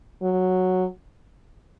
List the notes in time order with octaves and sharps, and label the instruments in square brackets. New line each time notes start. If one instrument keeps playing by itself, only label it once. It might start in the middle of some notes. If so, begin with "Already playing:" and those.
[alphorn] F#3